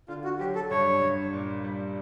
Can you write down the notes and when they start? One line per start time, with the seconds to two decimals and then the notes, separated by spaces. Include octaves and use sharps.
0.08 D3 F4
0.24 F#4
0.39 F#3 G4
0.55 A4
0.71 G2 C#5
1.02 G2
1.33 A#2
1.64 G3